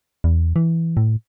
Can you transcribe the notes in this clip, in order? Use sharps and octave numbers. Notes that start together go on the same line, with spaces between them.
E2
E3
A2